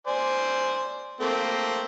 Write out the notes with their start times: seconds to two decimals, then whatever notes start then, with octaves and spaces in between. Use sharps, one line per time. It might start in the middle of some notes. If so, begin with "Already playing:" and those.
0.07 C5 D5 G#5
1.20 A3 A#3 C4